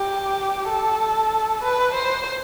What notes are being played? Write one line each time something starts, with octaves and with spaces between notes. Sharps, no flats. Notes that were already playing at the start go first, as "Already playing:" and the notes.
Already playing: G4
A4
B4
C5